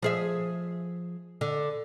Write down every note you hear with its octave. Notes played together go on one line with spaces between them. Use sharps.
F3 G#4 E5
D3